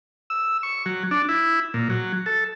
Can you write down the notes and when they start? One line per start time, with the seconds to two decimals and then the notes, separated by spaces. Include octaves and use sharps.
0.30 E6
0.63 C#6
0.86 F#3
1.11 D4
1.29 E4
1.74 A#2
1.90 F#3
2.26 A4